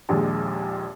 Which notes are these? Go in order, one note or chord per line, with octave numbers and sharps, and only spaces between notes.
A#1 D#2 A#2 G#3